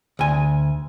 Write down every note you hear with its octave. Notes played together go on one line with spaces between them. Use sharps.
D2 G#5